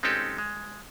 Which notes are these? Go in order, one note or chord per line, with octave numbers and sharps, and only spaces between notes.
G#3 C4 C#4 D#4 G4 A4
G#3